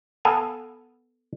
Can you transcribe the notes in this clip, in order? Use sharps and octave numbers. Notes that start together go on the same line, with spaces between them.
B3 A4 F5 G#5